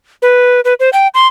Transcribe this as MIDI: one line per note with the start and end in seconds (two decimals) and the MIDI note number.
0.22 0.61 71
0.65 0.74 71
0.80 0.90 72
0.93 1.08 79
1.14 1.27 84